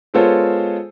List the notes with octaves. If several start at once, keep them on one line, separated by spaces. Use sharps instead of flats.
G#3 B3 F4 A4 C5 C#5